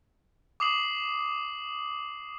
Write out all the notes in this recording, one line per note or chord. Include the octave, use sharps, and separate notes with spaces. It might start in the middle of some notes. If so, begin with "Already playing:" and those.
D6 D#6 C7 F#7